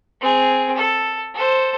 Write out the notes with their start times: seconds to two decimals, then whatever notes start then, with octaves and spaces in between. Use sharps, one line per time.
0.21 C4 G#4
0.76 A4
1.35 A4 C5